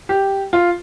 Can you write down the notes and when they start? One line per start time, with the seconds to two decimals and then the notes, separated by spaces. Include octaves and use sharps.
0.09 G4
0.53 F4